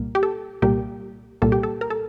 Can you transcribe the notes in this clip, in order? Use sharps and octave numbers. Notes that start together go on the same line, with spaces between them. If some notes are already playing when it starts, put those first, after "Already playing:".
Already playing: C2 A#2 G3 A#3
G4
A4
C2 A#2 G3 A#3 G4
C2 A#2 G3 A#3 A4
G4
A4
A#4
A4